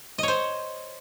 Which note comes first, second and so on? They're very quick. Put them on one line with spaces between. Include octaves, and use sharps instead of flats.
D#5 C#5 C5